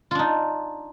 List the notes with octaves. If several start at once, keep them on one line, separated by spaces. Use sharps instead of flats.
D4 D#4 F4